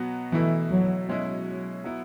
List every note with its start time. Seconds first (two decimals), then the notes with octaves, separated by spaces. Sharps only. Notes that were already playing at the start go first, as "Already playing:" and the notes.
Already playing: B2 F#3 B3 F#4
0.32 B2 E3 A3 E4
0.71 F#3
1.08 B2 F#3 G#3 C#4 E4
1.84 F#3 B3 E4